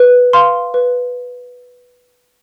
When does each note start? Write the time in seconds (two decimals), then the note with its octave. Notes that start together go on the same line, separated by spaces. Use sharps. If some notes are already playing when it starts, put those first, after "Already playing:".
Already playing: B4
0.33 F5 C6 F6
0.74 B4